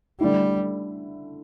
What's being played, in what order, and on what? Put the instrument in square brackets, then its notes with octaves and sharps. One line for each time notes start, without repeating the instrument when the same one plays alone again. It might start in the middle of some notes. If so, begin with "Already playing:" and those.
[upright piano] D3 A3 E4 [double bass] G3